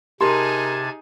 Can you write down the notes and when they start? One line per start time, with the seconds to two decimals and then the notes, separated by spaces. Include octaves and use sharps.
0.21 C3 D#4 G4 G#4 A#4 A5 C6 G#6